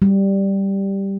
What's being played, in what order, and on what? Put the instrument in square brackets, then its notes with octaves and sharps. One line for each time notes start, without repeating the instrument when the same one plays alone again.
[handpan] G3